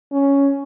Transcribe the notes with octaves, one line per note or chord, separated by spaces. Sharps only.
C#4